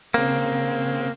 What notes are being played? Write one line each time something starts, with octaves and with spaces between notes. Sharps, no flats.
C#3 A#3 C4